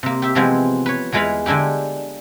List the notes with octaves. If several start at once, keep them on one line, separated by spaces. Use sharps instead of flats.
C3 A#3
G4 E5
C3 E3 F3 G#3 B3 C4
B4 C#5
E2 E3 G#3 B4 F5 B5
D3 G#3 D4 E4 G4